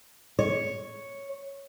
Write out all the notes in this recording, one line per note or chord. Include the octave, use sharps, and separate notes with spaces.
C#5